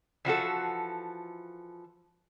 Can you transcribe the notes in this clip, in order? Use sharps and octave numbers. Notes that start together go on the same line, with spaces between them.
E3 F3 F#4 A4